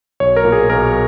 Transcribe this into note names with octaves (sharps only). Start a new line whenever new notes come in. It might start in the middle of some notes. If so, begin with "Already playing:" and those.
B1 C#5
A#4
A#2
G#4
B1 A#4